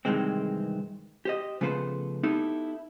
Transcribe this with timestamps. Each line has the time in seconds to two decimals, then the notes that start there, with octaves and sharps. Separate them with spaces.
0.05 G2 C3 D#3 E3 G#3 C4
1.25 G4 C5 D#5
1.61 C#3 F3 A3 B3 B4 C5
2.23 B3 D#4 E4 G4 A4